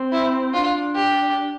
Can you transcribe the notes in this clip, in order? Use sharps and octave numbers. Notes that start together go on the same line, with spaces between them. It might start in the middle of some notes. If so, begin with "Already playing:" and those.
Already playing: C4
E4
D4 F4
G4